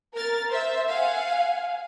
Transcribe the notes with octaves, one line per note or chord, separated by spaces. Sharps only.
A#4 F6 A6
C5 E5
F5 F#5 G#5